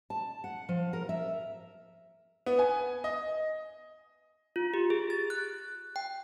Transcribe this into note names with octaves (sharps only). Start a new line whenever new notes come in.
A5
F#5
F3
A#4
E5
B3
G#5
D#5
F4
G4
G#4
A6
F#6
G5